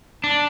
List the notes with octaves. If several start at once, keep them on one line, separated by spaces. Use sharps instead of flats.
D4